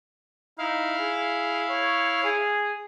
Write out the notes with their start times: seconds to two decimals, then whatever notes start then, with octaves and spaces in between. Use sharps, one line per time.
0.58 D#4 E4 F5
0.98 G#4
1.70 C#5
2.24 G#4